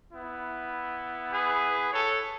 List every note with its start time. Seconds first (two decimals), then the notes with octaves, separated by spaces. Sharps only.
0.11 B3 E4
1.33 G#4 B4
1.93 A4 C#5